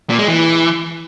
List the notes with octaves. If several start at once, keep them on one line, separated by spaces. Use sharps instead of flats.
A#2
G#3
E3